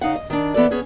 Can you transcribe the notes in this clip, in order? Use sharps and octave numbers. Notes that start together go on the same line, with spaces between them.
C#3 D#4 F5 F#5
D#5
D#3 D4
E3 B3 A4 D5
B3 C#4 G#4